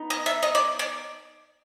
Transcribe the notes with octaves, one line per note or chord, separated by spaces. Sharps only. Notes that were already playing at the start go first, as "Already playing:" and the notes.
Already playing: B3 D#4
D#5
E5
D#5
D5
D5